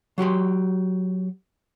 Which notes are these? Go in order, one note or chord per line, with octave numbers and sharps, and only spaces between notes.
F#3 F#4 G4 C6